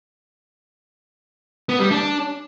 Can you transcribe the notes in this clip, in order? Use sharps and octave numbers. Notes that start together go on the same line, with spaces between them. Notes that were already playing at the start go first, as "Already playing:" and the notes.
B3
G3
D4